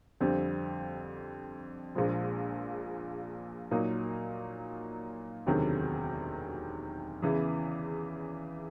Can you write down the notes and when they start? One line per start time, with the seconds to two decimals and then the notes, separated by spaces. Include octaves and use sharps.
0.20 F2 D3 G3 C4
1.95 A#1 A#2 F3 G#3
3.71 A#2 F#3 A#3 D#4
5.46 E1 D2 C3 D#3 F#3
7.22 E2 C#3 E3